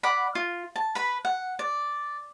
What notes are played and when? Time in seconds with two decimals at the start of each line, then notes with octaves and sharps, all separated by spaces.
0.03 D5 F#5 B5
0.35 F4
0.76 A5
0.95 B4 B5
1.25 F#5
1.59 D5